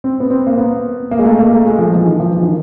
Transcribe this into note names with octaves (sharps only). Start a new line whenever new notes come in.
C4
B3
C4
A#3
B3
A#3
G#3
A3
A#3
A3
G#3
F3
E3
D#3
F3
E3
D#3